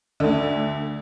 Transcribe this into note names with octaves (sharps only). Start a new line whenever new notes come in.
D2 D3